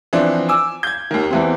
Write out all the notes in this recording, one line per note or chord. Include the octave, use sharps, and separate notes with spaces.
E3 F3 C4 D4
G#5 D6 E6
G6 G#6
D#2 D#3
E2 E3 C4